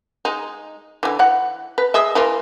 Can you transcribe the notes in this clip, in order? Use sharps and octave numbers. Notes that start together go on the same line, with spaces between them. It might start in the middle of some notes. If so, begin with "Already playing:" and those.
G#3 D#4
D3 E3
E3 F#5
B4
G#4 D#5 E5
E3 A#3 F4